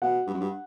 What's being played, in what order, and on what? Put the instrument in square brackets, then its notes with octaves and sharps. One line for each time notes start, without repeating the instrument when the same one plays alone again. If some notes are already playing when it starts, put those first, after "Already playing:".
[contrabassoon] B2 [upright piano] F#5
[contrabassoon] G2
F#2
G2